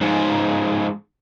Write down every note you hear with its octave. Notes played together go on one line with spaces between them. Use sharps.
G#2 F3